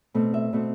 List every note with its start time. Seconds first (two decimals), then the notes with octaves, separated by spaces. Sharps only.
0.14 B2 A3 C4
0.34 E5
0.53 B2 A3 C4